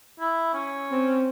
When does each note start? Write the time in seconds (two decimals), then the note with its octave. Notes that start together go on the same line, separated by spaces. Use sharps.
0.20 E4
0.54 C#4
0.91 C4